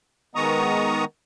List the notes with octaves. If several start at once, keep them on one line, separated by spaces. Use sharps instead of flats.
D#3 G#3 B3 A#5 C#6 D#6